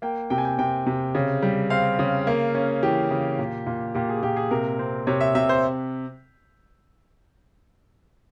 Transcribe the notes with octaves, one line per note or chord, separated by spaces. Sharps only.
A#3 G5
C3 G5
G#5
G5
C3 G5
C3
C#3
G3
C4 F5
C#3
A#3
C#4
E3 G4
C#3
A#2
A#2
A#2 G4
G#4
A#2 G4
G#4
C3 A#4
C4
C3 C#5
E5
C3 E5
C5